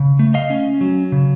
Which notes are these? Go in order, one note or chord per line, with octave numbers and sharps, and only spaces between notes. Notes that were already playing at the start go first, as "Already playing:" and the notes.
Already playing: C#3
A3
D#5 F5
C#4
F#3
C#3